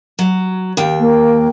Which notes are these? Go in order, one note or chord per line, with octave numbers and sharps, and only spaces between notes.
F#3
D#2 G5
A#3